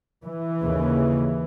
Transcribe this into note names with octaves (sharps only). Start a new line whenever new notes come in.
E3
D#2 C#3